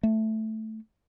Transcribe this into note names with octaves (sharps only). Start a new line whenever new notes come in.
A3